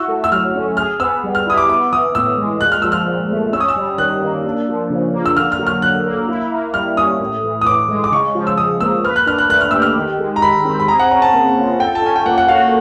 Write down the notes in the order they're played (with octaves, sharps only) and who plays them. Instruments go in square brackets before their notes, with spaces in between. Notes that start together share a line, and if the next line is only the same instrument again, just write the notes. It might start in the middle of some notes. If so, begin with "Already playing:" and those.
Already playing: [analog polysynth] E4 F#4 [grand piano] E6
[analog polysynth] A3
[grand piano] E6
[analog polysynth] F#3 [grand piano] F6
[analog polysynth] C#4
[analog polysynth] G#4 [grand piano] F6
[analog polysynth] B3 [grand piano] E6
[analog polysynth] G3
[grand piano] F6
[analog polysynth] E4 [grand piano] D#6
[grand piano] D6
[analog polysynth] B3 [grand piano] D6
[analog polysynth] E3 [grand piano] D#6
[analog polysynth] A2 [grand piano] E6
[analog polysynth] G#3
[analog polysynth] A#2 [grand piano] F#6
[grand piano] F6
[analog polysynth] F3 [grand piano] E6
[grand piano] F6
[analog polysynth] A#2
A3
[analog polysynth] C#4 [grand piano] E6
[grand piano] D#6
E6
[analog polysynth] G3
[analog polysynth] D#3 [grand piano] F#6
[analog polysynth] A#3
D4
F3
C#3
A#3
[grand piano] E6
[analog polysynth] D3 [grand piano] F6
[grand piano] F6
[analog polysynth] F#3
[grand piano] F6
[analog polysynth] D3 [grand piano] F#6
[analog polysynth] A#3
E4
A#3
[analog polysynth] G3 [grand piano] F6
[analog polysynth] C#4 [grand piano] D#6
[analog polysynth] A2
E3
[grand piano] D#6
[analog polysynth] A2 [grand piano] D6
[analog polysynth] G#3
[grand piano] D6
[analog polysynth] C#3 [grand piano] C#6
[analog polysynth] F3
[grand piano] E6
[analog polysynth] C#3 [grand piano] D#6
[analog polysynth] A#3 [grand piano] E6
[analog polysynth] B4 [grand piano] F6
[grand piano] F#6
[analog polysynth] D4 [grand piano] F6
[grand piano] F#6
[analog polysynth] A3 [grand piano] F#6
[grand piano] F6
[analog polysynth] G4 [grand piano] E6
[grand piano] F6
[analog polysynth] D#3
G#3
[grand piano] A#5
[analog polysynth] D#3 [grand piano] B5
[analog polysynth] C4
[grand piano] B5
[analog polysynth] G#4 [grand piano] A#5
[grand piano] F#5
[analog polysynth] C#4 [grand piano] A#5
[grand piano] A5
[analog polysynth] A#3
F4
[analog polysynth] A4 [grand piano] G5
[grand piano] A5
[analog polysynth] C#4 [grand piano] G#5
[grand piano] G5
[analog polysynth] A#3 [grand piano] F#5
[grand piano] F#5
[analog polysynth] F#4 [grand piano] F5